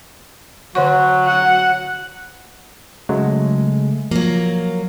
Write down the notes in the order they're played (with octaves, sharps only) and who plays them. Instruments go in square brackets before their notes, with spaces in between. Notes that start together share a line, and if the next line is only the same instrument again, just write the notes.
[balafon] D3 C#5 C#6 [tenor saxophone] F#3 [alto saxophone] F#4
[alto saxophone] F#4 [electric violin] F#5
[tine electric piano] C#3 G#3 A3 [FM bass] F#3
[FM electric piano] F3 [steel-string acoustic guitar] F#3 A#3